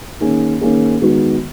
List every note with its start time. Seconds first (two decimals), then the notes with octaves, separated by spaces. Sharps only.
0.21 D#3 A#3 C#4 G#4
0.61 D#3 A#3 C#4 G#4
1.02 D#3 G#3 B3 F#4